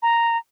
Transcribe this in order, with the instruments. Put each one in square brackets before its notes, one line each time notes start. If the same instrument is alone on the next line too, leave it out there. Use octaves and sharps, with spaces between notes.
[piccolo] A#5